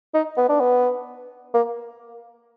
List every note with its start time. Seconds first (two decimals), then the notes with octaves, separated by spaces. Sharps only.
0.14 D#4
0.37 B3
0.49 D4
0.60 B3
1.54 A#3